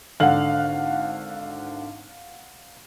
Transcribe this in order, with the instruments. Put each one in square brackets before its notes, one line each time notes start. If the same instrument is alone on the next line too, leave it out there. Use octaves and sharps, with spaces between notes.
[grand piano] G#1 D3 F#7 [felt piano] F5 F#5